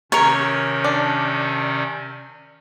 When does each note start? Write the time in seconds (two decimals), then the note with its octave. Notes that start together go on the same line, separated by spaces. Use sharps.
0.12 C3 D#3 C#4 A#4 C#5
0.84 D4